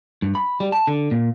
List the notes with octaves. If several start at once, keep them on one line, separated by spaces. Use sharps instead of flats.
G2
B5
G3
A5
D3
A#2